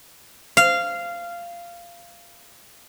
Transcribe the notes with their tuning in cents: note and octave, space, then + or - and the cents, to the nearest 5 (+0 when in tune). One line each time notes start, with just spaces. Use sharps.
F5 -15